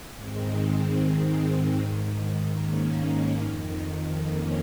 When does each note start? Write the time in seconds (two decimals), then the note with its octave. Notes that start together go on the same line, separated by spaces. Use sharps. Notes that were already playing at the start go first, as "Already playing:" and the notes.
0.16 G#2 D#3 G#3 C4
1.79 G#2 D#3
2.61 A#3 C#4
3.43 F2 D#3
4.24 A#3 C#4